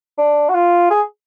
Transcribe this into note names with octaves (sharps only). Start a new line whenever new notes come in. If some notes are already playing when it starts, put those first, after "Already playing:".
D4
F#4
F4
G#4